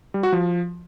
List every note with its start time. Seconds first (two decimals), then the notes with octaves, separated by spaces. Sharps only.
0.14 G3
0.23 F#4
0.32 F3